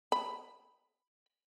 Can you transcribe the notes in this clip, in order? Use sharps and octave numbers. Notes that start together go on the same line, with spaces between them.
B5